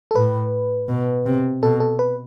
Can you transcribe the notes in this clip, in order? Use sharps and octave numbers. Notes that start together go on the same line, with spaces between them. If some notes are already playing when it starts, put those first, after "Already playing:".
A4
A2 B4
B2
C3
B2 A4
A4
B4